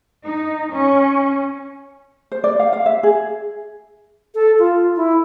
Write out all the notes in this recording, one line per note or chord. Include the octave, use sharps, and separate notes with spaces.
D#4
C#4
C5
D5
F5
F5
E5
G#4
A4
F4
E4